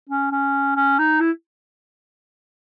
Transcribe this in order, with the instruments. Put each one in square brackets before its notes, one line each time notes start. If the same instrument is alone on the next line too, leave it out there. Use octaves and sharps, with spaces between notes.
[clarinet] C#4
C#4
C#4
D#4
E4